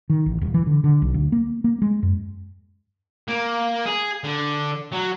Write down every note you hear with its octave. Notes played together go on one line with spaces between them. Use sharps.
D#3
A1
D#1
E3
D3
D3
B1
D2
A#3
A#3
G#3
F#2
A#3
G#4
D3
F#3